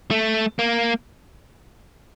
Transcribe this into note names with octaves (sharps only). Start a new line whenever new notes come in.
A3
A#3